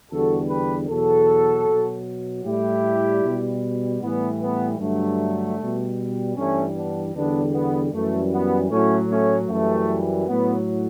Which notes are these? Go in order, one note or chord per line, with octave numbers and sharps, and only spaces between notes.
E2 D3 G3 F#4 A4
G4 B4
E2 B2 F#3 F#4 A4
B2 F#3
A2 G3 E4 G4
B2 G3
A2 E3 G3 B3
B3
G2 D3 F#3 A3
B2 G3
G2 E3 G3 A3 C#4
B3 D4
E2 D3 G3 B3 D4
B3
F#2 E3 G3 A3
B3
A2 F#3 A3 C#4
A3 C#4
F#2 E3 G3 A3
A2 F#3 B3